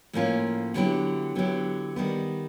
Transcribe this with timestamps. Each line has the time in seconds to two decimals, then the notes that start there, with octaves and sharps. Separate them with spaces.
0.13 A2 F3 A#3 C#4 F4
0.74 D3 F#3 B3 E4 G4
1.35 D3 F#3 B3 E4 G4
1.96 D#3 G3 B3